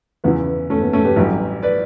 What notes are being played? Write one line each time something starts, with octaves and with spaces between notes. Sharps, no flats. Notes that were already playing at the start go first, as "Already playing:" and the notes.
E2 C#3 E3 B3
A3 C#4
B3
A3 C#4
G4 B4
A1 G2 F#3
B4 D5